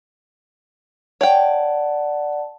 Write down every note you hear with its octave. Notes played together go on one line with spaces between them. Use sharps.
C#5 D5 F#5 G5 A5